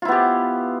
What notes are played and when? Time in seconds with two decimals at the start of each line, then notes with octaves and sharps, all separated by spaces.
0.02 F4
0.05 E4
0.08 B3
0.12 G4